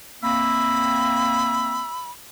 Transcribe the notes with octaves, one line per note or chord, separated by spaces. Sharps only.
A#3 C4 E5 B5